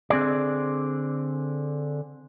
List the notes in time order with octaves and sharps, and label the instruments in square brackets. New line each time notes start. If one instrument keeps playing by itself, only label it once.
[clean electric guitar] D3 C4 G#4 D5